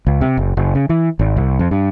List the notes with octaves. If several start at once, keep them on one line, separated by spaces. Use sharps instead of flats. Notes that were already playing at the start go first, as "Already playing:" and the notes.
C#2
C3
F#1
F#1
C#3
E3
G#1
C2
F2
G2